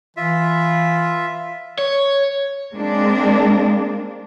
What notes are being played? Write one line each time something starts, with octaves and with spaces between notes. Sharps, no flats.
E3 F4 E5
C#5
G#3 A#3 C4 D4